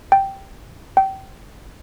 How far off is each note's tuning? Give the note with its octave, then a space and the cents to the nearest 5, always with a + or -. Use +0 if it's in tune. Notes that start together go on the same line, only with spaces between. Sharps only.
G5 -5
G5 -25